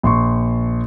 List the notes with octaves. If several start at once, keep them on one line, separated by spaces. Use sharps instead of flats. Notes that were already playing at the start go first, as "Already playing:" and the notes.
A#1 C6 C#6